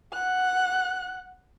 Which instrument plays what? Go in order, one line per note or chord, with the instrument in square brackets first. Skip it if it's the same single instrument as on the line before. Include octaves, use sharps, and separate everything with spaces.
[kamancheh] F#5 F#6